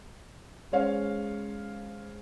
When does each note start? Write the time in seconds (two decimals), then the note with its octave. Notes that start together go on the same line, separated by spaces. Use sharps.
0.72 G#3 C#4 C5 C#5 F5